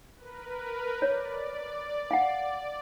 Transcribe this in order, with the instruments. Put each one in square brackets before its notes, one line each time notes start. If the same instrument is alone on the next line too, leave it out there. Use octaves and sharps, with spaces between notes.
[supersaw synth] A#4 B4
[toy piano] C#5 [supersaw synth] D5
[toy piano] F5 F#5